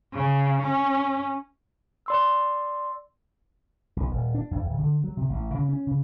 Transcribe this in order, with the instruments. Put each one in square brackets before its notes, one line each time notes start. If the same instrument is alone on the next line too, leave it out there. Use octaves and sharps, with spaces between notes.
[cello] C#3
C#4
[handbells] D5 C6 E6
[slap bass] B1
D#1
D4
E2
D1
D3
F#3
C3
A1
C#3
C#4
C#3